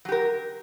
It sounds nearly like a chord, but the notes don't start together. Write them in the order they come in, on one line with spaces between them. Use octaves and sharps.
F#3 G4 A#4